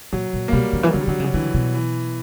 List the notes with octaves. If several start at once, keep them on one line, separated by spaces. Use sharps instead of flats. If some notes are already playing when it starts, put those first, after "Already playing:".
A#2 F#3
A#2
A#3
B2 G3
D3
E3
D3 F#3
G3
D3 F#3
C#3
F#3
D3 E3
B2
E3